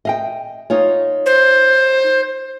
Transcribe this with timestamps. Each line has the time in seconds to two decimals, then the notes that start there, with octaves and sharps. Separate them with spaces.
0.05 D#5 F5 G5
0.70 D#4 F4 C#5
1.26 C5